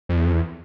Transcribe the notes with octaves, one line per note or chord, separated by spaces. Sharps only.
F2
E2
F2
E2